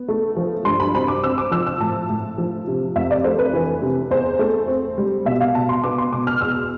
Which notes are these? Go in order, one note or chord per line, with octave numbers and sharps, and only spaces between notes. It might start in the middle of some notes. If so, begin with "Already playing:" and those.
Already playing: B3
A3
F3
G2 C6
B5
C4 B5
D6
C4 E6
D6
F3 E6
E6
A2 A5
A2
F3
C3
F2 E5
D5
A3 C5
B4
E3
C3
E2 C5
A3
C4
G3
B2 E5
F5
B2 A5
C6
B3 D6
C6
B2 D6
F6
E2 E6